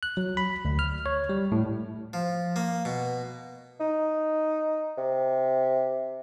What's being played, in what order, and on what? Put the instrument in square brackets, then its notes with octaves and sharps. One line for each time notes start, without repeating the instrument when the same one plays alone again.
[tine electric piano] F#6
F#3
B5
D2
F6
C#5
G3
A2
[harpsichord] F3
A#3
B2
[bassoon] D#4
C3